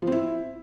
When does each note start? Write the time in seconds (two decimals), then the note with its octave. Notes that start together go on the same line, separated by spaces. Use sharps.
0.02 F3
0.07 C4
0.12 E4